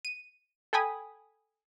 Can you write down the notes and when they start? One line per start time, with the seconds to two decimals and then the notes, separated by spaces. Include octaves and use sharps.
0.05 D#7
0.73 A4 G5 G#5 B5 D#6